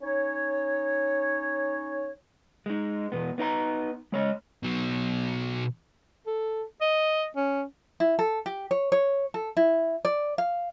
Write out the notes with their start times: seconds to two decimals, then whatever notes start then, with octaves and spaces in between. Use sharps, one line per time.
0.01 C#4 D#4 C#5
2.66 G#3 D#4
3.12 E2 B2 B3
3.38 B3 D#4 D5 A#5
4.12 G#3 C#5 D#5
4.63 B2 F#3
6.27 A4
6.81 D#5
7.36 C#4
8.00 E4
8.19 A4
8.46 G4
8.71 C#5
8.92 C#5
9.34 A4
9.57 E4
10.05 D5
10.38 F5